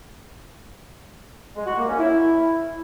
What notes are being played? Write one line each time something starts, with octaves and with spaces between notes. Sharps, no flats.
G#3
F#4
A#3
C#4
E4